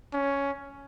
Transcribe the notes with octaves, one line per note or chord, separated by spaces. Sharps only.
C#4